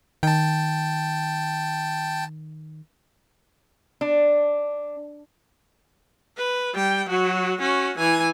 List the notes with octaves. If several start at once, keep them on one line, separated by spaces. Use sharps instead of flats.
D#3 G5 A5
D4
B4
G3 G5
F#3 F#4
C#4 F#4
E3 G#5